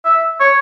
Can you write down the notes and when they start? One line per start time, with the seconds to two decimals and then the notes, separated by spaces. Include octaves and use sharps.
0.05 E5
0.40 C#5